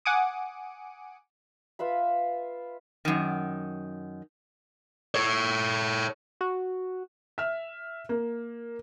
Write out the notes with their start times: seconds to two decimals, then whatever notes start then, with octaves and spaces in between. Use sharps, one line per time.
0.05 F#5 G#5 D6 D#6
1.79 F4 B4 E5 B5
3.05 F#2 D#3
5.15 A4 C#5
6.41 F#4
7.38 E5 F6
8.09 A#3